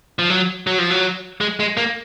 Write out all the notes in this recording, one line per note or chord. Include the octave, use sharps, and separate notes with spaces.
F3
F#3
F#3
F3
F#3
G#3
G#3
A#3